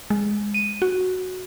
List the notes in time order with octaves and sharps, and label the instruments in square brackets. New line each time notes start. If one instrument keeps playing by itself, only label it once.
[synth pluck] G#3
D#7
F#4